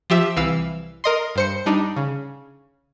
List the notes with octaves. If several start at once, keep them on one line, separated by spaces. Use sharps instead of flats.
F3 G4 E5
C2 E3 F5 E6
A#4 D#5 C6
G2 C5 C#7
G3 D4 D#4
C#3